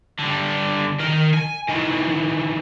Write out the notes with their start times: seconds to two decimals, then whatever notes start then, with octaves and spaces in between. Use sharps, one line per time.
0.19 D3 G3
1.00 D#3 A#4
1.34 G#5
1.68 D#3 E3